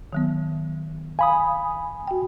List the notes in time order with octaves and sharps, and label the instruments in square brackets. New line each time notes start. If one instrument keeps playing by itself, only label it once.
[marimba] D#3 F#3 B3
[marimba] F5 [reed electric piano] G#5 B5 D#6
[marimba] F#4 G5